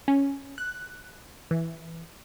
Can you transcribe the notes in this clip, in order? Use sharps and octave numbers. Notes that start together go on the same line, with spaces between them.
C#4
F#6
E3